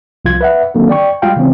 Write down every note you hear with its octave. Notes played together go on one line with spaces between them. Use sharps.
C2 F3 F4 G#6
B4 E5 F#5
D3 D#3 F#3 A#3 C4
D5 G5 C#6
G3 G#3 F4 F5 G5
C#3 E3 G#3 C4 C#4